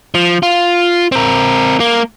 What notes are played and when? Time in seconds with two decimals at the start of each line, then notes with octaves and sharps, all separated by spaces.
0.14 F3
0.43 F4
1.12 C4 A#4
1.80 A#3